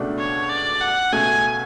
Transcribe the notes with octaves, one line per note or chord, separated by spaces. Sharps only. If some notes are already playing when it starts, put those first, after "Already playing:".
Already playing: C#2 B2 A3 D4
C#5
D5
F#5
C#2 B2 A3 G#5